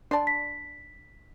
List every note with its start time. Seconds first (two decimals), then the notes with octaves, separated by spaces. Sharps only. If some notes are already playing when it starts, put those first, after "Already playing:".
0.11 D4 D5 A5 C6
0.27 B6